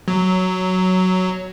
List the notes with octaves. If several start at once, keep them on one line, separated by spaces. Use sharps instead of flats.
F#3